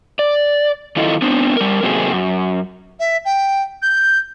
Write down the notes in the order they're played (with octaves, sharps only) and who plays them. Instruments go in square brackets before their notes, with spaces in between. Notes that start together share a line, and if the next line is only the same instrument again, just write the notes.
[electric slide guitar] D5
D#3 F#3 E4 F4 A4 D#5
B3 C4 D4
G3 A#4
C3 F#3 A3 A#3 C4 G#4
F#2
[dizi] E5
G5
G6